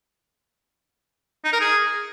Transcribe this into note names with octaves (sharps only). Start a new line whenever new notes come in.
D#4
A#4
G#4